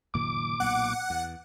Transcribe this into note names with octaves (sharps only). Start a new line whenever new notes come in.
F#1 A#2 D#3 D6
B1 A#2 A#3 F#5
E2